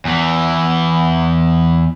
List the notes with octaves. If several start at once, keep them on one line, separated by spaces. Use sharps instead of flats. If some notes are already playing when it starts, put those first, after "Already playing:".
E2 E3